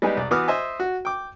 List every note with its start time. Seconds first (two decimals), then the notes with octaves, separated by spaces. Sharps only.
0.02 G3 G#3 B3 D#4 G#4
0.17 C2 D5
0.31 E3 B3 F#4 D6 D#6 F6
0.48 C5 D#5 E5 G#5
0.80 F#4
1.05 G5 D6